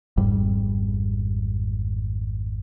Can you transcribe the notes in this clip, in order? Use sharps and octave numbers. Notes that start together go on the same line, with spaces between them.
G#1 F2 G#2 G3